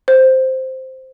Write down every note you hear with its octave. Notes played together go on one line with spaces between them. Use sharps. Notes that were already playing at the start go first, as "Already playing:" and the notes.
C5